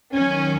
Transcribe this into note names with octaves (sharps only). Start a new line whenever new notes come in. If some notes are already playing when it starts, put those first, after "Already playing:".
D#2 D#3 F#3 C#4